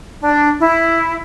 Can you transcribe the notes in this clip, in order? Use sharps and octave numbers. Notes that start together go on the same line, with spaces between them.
D4
E4